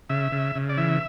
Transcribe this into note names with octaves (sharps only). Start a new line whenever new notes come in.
C#3 E5
C#3
C#3
D5
E3 E5